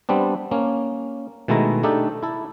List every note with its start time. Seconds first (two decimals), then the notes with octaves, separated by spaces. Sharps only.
0.09 G3 B3 C4 D4
0.51 A#3 C#4
1.48 B2 D#3 G#3 A3 E4 A#5
1.83 A3 D4 D#4 G4 A4
2.23 E4 A4